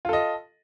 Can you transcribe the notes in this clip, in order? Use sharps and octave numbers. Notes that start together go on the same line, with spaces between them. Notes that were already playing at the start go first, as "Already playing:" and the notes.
F4 A4 D#5